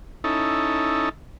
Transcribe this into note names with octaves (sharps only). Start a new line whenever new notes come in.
C#4 D#4 E4 A4